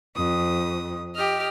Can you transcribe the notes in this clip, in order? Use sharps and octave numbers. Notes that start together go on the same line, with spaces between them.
F2 D#6
G4 D#5 F6